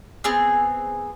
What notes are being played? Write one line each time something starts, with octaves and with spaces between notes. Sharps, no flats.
B3 C4 G#4